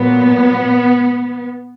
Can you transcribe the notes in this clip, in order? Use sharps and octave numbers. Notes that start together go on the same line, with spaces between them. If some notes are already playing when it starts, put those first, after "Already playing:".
Already playing: A#2 F#3 B3